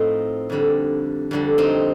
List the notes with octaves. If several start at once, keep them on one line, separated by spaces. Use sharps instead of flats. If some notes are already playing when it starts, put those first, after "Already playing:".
Already playing: A2 F3 C4 D#4 F4
F2 D3 G3
F2 D3 G3
C4 D#4